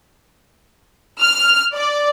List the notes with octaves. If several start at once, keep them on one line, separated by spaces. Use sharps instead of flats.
F6
D5